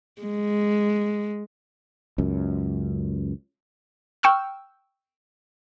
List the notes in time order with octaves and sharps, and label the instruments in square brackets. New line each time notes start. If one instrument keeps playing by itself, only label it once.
[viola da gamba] G#3
[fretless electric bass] C#2 F#2
[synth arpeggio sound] G5 C#6 E6 F6